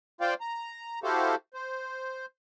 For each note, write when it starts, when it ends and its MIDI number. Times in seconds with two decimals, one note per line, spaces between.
0.21 0.34 65
0.21 0.34 72
0.21 0.34 74
0.21 0.34 77
0.21 0.34 79
0.41 0.99 82
1.03 1.35 64
1.03 1.35 66
1.03 1.35 67
1.03 1.35 69
1.03 1.35 72
1.03 1.35 77
1.54 2.26 72